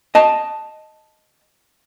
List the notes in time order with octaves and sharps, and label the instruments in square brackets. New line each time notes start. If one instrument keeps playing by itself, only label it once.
[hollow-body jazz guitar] D#5 A5